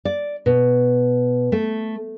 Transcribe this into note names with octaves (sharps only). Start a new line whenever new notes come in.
D5
B2
A3